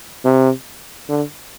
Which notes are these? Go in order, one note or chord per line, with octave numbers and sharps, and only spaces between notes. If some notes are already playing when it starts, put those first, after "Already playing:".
C3
D3